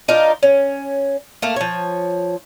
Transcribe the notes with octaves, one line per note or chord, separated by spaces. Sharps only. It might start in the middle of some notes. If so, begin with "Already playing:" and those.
D4 D#4 F4 A#4
C#4
A3 A#3
F3 C#5